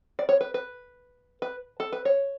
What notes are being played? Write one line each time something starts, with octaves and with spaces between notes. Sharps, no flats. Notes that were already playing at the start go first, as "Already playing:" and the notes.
D5
C#5
B4
B4
B4
A4
B4
C#5